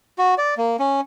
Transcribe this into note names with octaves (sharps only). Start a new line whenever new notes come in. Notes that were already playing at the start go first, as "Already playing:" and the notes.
F#4
D5
A#3
C#4